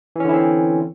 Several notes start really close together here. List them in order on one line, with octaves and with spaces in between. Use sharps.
E3 C#4 D3 E4 C4